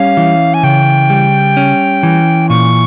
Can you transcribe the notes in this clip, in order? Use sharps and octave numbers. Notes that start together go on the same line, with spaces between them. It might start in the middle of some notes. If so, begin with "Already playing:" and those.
Already playing: G3 C#4 F5
E3
G#5
C#3 G5
G3
C#4
E3
A#2 C#6